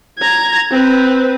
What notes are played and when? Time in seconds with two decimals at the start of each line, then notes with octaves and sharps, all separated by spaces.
0.18 A#5 G#6
0.71 C4 B4